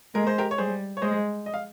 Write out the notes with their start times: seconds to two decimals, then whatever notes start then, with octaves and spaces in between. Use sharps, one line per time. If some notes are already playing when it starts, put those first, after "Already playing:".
0.15 G#3 A#4
0.27 C5
0.38 G4 A#4
0.51 C#5
0.58 G3 G#4 C5
0.97 C#5
1.02 G#3 C5 D#5
1.46 D#5
1.54 F5